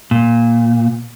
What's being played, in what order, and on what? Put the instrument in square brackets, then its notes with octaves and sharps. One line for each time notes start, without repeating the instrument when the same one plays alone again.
[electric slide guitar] A#2